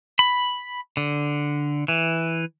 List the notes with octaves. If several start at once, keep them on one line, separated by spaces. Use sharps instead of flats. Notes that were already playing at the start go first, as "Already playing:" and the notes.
B5
D3
E3